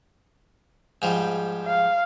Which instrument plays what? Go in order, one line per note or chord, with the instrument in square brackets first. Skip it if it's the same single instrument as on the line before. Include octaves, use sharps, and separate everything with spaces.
[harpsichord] G#2 F3 G3
[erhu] F5